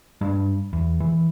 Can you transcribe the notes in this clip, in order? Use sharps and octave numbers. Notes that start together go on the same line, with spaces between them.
G2
E2
E3